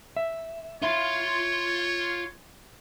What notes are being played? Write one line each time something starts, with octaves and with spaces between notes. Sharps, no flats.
E5
E4 F4 C#5 C6